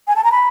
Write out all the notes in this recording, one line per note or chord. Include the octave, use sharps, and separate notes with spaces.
G#5
A5
A#5
B5